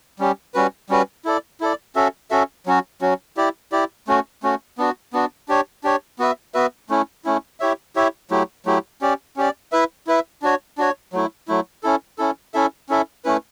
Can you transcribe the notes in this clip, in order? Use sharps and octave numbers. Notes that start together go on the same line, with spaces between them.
G3 C#4 G4
G3 C#4 F#4 B4
G3 C#4 F#4 B4
E4 A4 D5
E4 A4 D5
C#4 F#4 A4 E5
C#4 F#4 A4 E5
F#3 C#4 F#4
F#3 C#4 F#4
E4 G4 D5
E4 G4 D5
A3 C#4 F#4
A3 C#4 F#4
B3 D4 F#4
B3 D4 F#4
D4 G4 C#5
D4 G4 C#5
B3 F#4 B4 E5
B3 F#4 B4 E5
A3 C#4 E4
A3 C#4 E4
E4 G4 C#5 E5
E4 G4 C#5 E5
F#3 A3 E4 G4
F#3 A3 E4 G4
C#4 G4 D5
C#4 G4 D5
E4 B4 E5
E4 B4 E5
D4 F#4 C#5
D4 F#4 C#5
F#3 A3 E4
F#3 A3 E4
C#4 E4 A4
C#4 E4 A4
C#4 E4 A4 E5
C#4 E4 A4 E5
A3 C#4 E4 B4